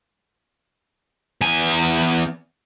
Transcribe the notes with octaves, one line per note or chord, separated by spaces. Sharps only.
E2 G#5